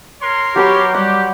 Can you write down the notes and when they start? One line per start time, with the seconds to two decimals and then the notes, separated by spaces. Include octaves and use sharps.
0.22 A#4 C#5 C6
0.56 F#3 G4 B4 C#6
0.94 G3 G4 F#5